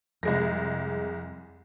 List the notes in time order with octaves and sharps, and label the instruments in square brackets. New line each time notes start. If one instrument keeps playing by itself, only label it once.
[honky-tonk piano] C2 G#3 A#6 [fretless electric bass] F2